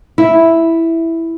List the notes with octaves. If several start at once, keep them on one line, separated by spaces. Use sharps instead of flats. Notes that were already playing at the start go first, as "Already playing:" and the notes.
E4